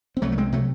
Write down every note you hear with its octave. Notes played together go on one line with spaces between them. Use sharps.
C4
C2 F#3 A3
A3
G#3 C4
C3 F#3 A3